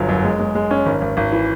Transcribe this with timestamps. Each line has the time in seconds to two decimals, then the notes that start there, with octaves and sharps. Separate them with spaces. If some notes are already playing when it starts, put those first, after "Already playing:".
Already playing: G1 F#3
0.09 F#2
0.24 G#3
0.40 G#3
0.55 G#3
0.71 C#4
0.86 G#1
1.01 G#1
1.17 G#1
1.32 E3